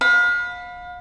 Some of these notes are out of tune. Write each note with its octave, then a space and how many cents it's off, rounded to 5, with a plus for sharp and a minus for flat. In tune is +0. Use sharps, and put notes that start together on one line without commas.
F5 +35 B5 +0